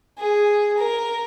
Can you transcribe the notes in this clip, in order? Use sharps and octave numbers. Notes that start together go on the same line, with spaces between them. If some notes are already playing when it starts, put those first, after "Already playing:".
G#4
A#4